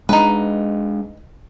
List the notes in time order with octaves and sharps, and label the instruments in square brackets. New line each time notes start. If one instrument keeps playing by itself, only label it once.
[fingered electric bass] G#3 D4 [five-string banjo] D#4 B4